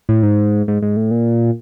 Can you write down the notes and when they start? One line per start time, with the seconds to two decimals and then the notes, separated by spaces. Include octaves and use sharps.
0.09 A2
0.23 G#2
0.68 G#2
0.82 G#2
0.96 A2
1.11 A#2